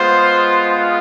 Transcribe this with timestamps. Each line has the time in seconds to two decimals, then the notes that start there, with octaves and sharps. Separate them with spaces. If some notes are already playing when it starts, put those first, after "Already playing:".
Already playing: G#3 B3 F4 C5